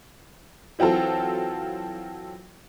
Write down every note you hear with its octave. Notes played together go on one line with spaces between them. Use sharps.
E3 F#3 C4 F4 A4